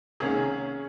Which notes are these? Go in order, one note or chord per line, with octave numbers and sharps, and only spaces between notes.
C2 D#3 A#3 C#4 G#4